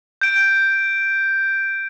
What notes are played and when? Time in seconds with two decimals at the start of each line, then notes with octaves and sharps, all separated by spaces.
0.21 G6 D7